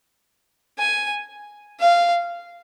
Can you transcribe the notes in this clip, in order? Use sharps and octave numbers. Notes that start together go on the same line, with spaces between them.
G#5
F5